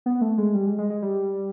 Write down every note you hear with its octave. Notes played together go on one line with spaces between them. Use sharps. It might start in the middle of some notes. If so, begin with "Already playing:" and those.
B3
A3
G#3
G3
G#3
G#3
G#3
G3